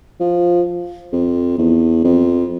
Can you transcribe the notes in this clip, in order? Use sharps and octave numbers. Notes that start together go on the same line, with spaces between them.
F3
F2
E2
F2